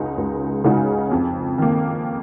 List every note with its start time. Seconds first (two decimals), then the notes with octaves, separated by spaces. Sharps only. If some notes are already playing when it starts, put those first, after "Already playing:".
Already playing: C#2 C#3 G#3 D#4 F#4
0.18 C#2
0.64 C#3 G#3 D#4 F#4
1.12 F2
1.58 D#3 A#3